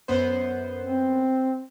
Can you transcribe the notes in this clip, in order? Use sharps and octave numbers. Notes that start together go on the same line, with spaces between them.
F#2 B3 C5
C4